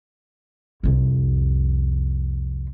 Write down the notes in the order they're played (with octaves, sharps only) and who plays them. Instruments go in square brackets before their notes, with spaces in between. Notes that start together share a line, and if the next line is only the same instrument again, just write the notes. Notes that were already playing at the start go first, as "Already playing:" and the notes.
[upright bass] C2 F2